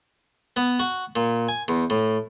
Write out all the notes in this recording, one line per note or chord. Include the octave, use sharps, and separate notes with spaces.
B3
F#4
A#2
G#5
E2
A2